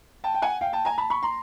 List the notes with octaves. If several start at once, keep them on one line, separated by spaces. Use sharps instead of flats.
G5 A5
G5
F#5 G#5
F5 G5
G5 A5
G#5 A#5
A5 B5
B5 C#6
A#5 C6